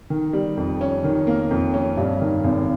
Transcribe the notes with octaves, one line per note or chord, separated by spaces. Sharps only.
D#3
G3
F2
C#4
D#3
A#3
F2
C#4
G2
D#3
G#1